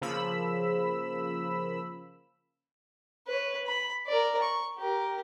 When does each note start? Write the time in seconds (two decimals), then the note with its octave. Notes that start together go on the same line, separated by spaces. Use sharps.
0.02 C#3 F3 A#3 B5 E6
3.27 B4 C#5
3.66 B5
4.07 A#4 D5
4.41 C#6
4.77 G4 A#4